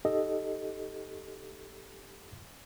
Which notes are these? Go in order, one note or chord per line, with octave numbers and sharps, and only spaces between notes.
D#4 G4 A4 D#5